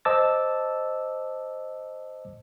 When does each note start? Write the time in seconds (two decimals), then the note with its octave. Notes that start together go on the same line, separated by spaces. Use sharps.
0.05 C5 D#5 A5 D6 E6 A6